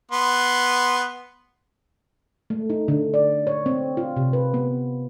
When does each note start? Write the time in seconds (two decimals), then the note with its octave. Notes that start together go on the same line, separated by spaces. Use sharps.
0.12 B3 C6
2.50 A3
2.70 D#4
2.88 D3
3.14 D5
3.47 C#5
3.66 C4
3.97 F4
4.16 C3
4.33 B4
4.54 B3